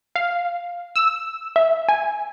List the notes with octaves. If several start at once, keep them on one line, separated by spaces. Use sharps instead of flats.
F5
E6
E5
G#5